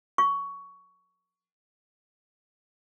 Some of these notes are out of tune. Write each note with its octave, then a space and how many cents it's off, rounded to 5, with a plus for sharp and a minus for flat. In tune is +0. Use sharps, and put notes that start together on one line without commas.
C#6 +15